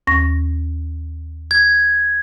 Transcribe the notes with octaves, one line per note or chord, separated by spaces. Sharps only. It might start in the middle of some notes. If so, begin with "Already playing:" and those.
D#2 C#6 A#6
G#6